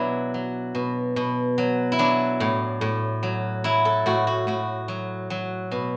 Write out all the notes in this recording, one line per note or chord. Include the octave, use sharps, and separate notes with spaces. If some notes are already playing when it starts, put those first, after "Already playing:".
Already playing: B2 F#3 D4 E4 F#4
F#3
B2
B2
F#3
E4
F#3 D4
A2
A2
F#3
F#3 E4
A4
A2 F#4
F#4
A2 F#4
F#3
F#3
B2